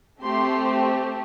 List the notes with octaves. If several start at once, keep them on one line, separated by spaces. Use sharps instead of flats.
A3 C4 G4 C6